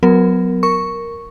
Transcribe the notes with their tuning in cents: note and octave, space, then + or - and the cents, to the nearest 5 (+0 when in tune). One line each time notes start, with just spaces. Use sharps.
F#3 +0 B3 +25 A#4 +0
A#4 +0 C#6 +0